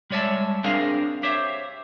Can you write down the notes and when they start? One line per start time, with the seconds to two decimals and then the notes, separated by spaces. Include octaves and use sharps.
0.10 G3 G#3 C#5 D5 E5 A5
0.64 C4 D4 G#4 A#4 F5
1.23 G4 C5 C#5 E5